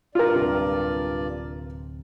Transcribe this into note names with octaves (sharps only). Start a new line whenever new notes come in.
G2 F4 A#4 D5
D1 C3